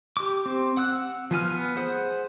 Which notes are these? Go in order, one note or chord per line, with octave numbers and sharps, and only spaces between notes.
G4 D6
C4
F#5 E6 F#6
F3 B3 G#5 F6
B3
G#4 C5 F#5